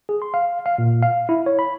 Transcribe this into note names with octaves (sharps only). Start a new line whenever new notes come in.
G#4
C6
F5
F5
A#2
F5
E4
C#5
B5